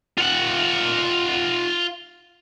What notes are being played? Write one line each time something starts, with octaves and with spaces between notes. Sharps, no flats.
F4 F#5